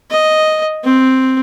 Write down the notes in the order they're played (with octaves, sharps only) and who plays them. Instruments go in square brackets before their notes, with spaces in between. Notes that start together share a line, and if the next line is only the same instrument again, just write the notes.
[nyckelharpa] D#5
C4